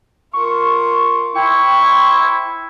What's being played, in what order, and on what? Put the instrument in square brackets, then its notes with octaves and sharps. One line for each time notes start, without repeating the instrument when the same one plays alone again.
[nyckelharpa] F4 A#4 [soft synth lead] C#6
[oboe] E4 [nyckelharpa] C5 C6 [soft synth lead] G5 [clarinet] C#6